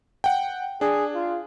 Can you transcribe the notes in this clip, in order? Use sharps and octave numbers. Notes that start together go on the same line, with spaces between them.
F#5 G5
D4 G#4
F4